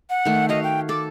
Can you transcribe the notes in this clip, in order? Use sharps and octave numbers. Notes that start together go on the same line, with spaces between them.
F#5
D#3 A3
F#4 C#5 D#5 F5
G5
A4 D6